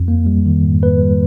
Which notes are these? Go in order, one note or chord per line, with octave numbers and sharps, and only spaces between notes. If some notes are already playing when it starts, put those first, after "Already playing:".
Already playing: F2
A#3
G3
D#3
G#2
A#3 B4
G3